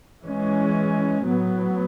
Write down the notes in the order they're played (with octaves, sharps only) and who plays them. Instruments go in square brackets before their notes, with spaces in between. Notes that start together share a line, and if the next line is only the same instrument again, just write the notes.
[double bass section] E3 G#3 C#4
A2 F#3 B3